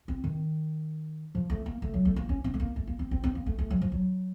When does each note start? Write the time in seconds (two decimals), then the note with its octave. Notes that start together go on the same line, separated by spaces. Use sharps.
0.08 C4
0.24 D#3
1.35 F3
1.50 A3
1.66 A#3
1.82 A3
1.94 F#3
2.05 A3
2.16 A#3
2.29 C#4
2.44 C4
2.54 A3
2.60 A#3
2.76 A3
2.87 A#3
2.99 C4
3.11 C4
3.24 C4
3.35 A#3
3.46 A3
3.58 A3
3.70 F#3
3.81 F3
3.92 F#3